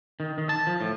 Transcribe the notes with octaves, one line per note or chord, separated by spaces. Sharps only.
D#3
D#3
A5
F3
A2